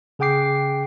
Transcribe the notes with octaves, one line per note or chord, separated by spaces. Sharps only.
C#3 G#4 F#5 G5 D6 C7